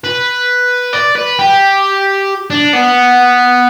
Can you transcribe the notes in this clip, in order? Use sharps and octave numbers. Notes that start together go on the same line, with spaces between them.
B4
D5
B4
G4
D4
B3